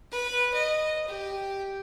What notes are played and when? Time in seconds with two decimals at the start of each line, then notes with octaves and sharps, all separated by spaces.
0.11 B4
0.54 D#5
1.07 G4